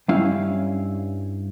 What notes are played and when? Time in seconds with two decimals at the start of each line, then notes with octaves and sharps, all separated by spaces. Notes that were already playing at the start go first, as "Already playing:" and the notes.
0.08 G2 G3 C#4 E4 F5